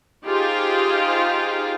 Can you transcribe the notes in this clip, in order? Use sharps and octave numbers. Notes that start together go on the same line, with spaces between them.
D#4 F4 G4 G#4 C5 F5